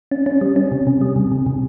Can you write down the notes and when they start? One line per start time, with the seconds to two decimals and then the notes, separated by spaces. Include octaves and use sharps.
0.11 C#4
0.26 C#4
0.41 G3
0.56 C#4
0.72 C3
0.87 C3
1.01 G3
1.16 C3
1.32 C3
1.46 C3